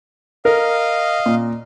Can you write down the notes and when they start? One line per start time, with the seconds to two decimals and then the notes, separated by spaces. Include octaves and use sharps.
0.45 A#4 D#5 F5
1.26 A#2